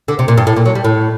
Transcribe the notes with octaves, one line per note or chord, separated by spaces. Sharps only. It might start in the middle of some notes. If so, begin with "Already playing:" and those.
D3
C3
A#2
G2
A2
A#2
F#3
G3
A2